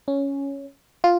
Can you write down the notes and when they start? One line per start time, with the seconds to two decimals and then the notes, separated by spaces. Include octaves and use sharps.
0.08 C#4
1.04 F4